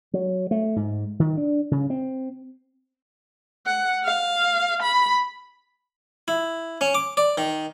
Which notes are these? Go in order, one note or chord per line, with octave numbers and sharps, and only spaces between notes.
F#3
A3
G#2
D#3
D4
C#3
C4
F#5
F5
B5
E4
C#4
D6
D5
D#3